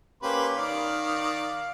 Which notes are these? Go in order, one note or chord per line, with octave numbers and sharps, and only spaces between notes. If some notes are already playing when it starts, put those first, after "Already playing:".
A#3 C#4 G4 B4 C5
D#3 D5 F5